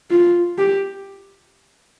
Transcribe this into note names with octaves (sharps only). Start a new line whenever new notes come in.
F4
G4